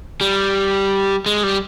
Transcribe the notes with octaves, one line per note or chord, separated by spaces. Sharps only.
G3
G#3
G3